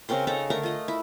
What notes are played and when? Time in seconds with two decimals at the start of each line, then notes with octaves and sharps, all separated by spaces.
0.09 C#3 C4 A#4 C6
0.27 C#3 D#4 A4 A#5
0.50 D3 A3 A#4 A#5
0.63 F4 D#5
0.88 E4